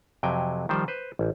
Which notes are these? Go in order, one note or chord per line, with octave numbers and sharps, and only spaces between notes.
F2 C3 F#3 G5 G#5
D#3 F3 G3 C5
B4 C5
A1